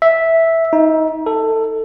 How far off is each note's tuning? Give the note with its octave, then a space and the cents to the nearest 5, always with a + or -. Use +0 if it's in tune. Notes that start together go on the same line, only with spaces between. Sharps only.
E5 -5
D#4 +25
A4 +15